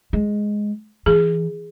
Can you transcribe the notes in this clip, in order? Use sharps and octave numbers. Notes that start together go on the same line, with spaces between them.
G#3
E3 G#4